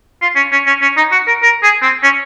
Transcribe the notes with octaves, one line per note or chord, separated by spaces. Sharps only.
F4
C#4
C#4
C#4
C#4
D#4
F#4
A#4
A#4
G#4
C4
C#4